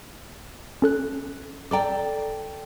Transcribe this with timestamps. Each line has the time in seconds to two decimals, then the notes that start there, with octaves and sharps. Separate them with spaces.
0.82 C#4 A4 F#6
1.71 A4 D5 G5 A#5 D6